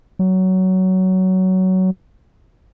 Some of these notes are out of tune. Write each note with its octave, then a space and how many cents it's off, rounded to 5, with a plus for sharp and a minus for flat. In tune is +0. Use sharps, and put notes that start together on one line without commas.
F#3 +15